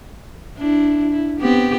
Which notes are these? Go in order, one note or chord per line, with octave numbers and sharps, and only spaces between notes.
D4 E4
E4
B3 C4 G4